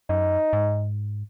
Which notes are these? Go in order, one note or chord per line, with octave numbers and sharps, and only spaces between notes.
F#2 D#4
G#2